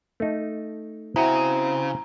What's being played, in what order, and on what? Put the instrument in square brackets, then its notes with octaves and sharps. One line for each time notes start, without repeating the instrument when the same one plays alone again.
[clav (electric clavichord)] A3 D#4
[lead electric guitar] C#3 [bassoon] C4 [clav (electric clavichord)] E4 F#4 [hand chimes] A#5